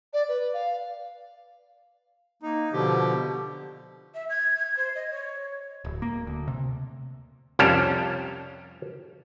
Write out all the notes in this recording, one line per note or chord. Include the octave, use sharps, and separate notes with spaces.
D5
B4
F5
A#3 D#4
B2 D3 F3 G4
E5
G#6
G#6
C5
D#5
C#5
D1
A#3
D2
C3
C2 F2 G3 C#4 F5 A5